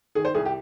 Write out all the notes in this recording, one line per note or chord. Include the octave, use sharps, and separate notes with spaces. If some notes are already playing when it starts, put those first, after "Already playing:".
D#3 G#4
C5
C2 G#4
G4